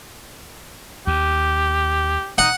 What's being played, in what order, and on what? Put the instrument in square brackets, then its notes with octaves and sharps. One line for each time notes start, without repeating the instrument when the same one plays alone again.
[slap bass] D#2 [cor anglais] G4
[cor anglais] D#4 [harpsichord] F#5